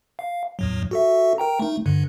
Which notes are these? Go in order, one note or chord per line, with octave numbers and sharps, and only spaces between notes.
F5
E2 A2 F#3
F#4 A4 E5
A#4 G5 A#5
A3 D#4
G2 D3